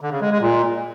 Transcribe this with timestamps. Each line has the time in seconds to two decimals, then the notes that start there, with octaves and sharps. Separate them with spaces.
0.01 D3
0.11 C#3
0.21 G#3
0.31 G#3
0.41 A#2